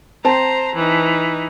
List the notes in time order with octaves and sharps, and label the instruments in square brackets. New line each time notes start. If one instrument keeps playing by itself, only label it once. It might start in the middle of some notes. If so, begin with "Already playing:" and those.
[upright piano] C4 A5 [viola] C5 A#5
[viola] E3 D#4